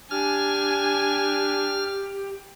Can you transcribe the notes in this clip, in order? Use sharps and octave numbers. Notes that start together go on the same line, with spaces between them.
D4 G4 G#5 F6